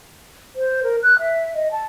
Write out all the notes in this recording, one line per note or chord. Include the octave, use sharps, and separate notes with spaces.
C5
A#4
F#6
E5
D#5
A5